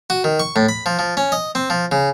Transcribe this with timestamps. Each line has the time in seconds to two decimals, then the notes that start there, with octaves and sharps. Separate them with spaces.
0.10 F#4
0.24 D#3
0.39 C#6
0.56 A2
0.69 B5
0.86 F3
0.99 F3
1.17 C#4
1.32 D#5
1.55 C4
1.70 F3
1.92 C#3